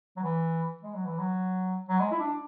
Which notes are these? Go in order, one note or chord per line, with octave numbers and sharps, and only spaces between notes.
F#3
E3
G#3
F#3
E3
F#3
F#3
G#3
E4
D4